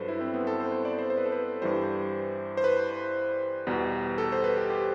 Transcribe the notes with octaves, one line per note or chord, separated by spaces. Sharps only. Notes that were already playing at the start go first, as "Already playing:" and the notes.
Already playing: G2 F#3 A4 B4 C5
E4
C4
B3
A4
C5
C5
D5
C5
C5
B4
A4
B4
G2 E3 G3 C5
C5
B4
E2 B2 G3
A4
C5
B4
G4
G4